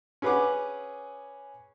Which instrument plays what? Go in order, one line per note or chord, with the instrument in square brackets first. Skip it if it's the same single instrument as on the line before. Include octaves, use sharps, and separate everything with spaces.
[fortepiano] C#4 G#4 B4 F#5 D6